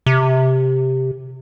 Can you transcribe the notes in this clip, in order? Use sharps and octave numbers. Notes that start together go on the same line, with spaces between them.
C3